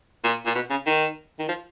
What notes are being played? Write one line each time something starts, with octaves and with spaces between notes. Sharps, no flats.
A#2
A#2
B2
C#3
D#3
D#3
F3